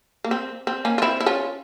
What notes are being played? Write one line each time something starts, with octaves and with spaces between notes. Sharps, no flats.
A#3
C4
C4
A#3 C#4
F4
C4 E4
E4
C#4 F4